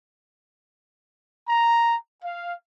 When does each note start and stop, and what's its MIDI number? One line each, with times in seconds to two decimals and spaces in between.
1.48 1.95 82
2.24 2.55 77